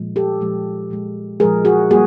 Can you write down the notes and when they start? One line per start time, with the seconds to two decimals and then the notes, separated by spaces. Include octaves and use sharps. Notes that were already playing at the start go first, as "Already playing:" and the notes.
Already playing: A#2 F3 G#3
0.16 G4 A4
0.41 A#2 F3 G#3
0.90 A#2 F3 G#3
1.40 A#2 F3 G#3 G#4 A#4
1.65 F#4 G#4
1.90 G3 A#3 F#4 G#4